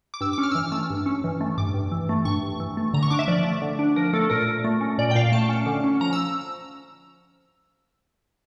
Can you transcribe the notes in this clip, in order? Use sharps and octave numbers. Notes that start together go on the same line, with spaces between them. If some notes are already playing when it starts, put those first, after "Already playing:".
D6
G2 E6
D6
C#4
F6
E6
E3 F6
A3 E6
G2
C#4
E3
A3
G2 D6
G2
E3
A3
G2 C#6
G2
E3
A3
D3 A#5
C#6
D4 D6
E5
F3 D5
A3
D3
D4
F3 A#4
A3 A4
A#2 A#4
A#2
A3
C#4
A#2 D5
G5
A#2 F5
A3 A5
C#4
D3
C#4
F3 A#5
E6